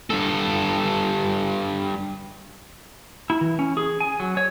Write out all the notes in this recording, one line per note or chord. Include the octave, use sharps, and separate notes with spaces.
G2 A4
E4
E3
C#4
G#4
G#5
F#3
C#5